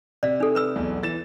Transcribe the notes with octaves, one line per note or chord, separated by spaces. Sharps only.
C3 D5 F5
D#4 A4
B4 B5 E6
B1 E2
E3 A6 E7